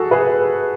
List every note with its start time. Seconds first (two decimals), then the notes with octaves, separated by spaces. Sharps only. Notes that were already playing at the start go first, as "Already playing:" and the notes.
Already playing: F#4 G#4 A4
0.11 G#4 B4